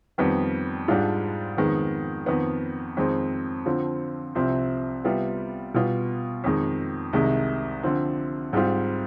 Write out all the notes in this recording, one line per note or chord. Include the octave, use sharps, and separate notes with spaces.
F2 D#3 G3 B3
G#2 G3 D4 F4
F2 D#3 G#3 B3
F2 D#3 B3
F2 D#3 G#3 C4
D3 F3 C4 F4
C2 C3 F3 C4
C3 G3 B3 F4
B2 G3 B3 F4
F2 D#3 G#3
C2 C3 D#3 G#3
D3 F3 C4
G#2 G3 C4 F4